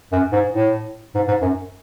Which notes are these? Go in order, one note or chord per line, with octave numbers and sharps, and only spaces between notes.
F#2
G#2
A2
G#2
G#2
F#2